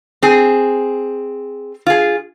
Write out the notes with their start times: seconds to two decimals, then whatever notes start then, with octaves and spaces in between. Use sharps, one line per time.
0.23 C4 G#4
1.86 F4 G#4